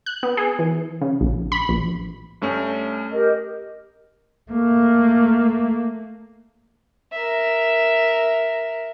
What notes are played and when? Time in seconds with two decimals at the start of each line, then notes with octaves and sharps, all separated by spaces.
0.06 F#6
0.23 B3
0.37 G#4
0.59 E3
1.01 C#3
1.21 A#1
1.52 B5
1.69 A#1
2.42 G2 A3 C#4
3.11 G4 A#4 D#5
4.52 A3 A#3
7.12 A#4 E5